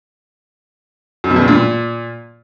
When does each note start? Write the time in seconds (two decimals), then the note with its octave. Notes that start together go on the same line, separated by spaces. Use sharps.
1.24 F#2
1.30 B2
1.36 E2
1.42 G2
1.48 A#2